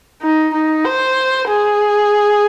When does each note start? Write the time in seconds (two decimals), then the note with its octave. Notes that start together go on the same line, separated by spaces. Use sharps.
0.22 D#4
0.54 D#4
0.85 C5
1.49 G#4